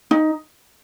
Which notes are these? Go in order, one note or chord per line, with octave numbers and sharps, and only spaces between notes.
D#4